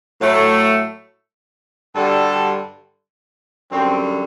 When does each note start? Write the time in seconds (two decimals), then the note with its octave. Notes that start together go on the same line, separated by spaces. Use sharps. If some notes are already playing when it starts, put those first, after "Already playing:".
0.20 A2 F#3 A3
1.95 G2 D3 G3 F#4 A4
3.70 F#2 D3 G3 C4